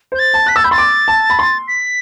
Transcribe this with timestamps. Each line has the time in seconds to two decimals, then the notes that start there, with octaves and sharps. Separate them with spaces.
0.12 C5 G6
0.19 A6
0.34 A5
0.46 F#6 B6
0.56 E6 A6
0.64 B5 G6
0.71 C6 A6
0.78 D6
1.08 A5
1.30 B5
1.39 C6
1.68 B6